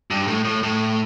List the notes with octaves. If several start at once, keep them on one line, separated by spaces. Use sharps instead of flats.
G2
A2
A2
A2